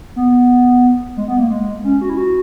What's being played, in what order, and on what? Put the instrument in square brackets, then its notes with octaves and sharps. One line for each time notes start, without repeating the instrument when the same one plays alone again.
[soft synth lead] B3
G#3
B3
A#3
G#3
C#4
F#4
E4
F#4